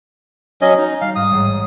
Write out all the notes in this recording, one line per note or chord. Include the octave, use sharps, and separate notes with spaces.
F#3 C#4 D#5
D#4
G3 F5
G#2 D#6
A1 G#2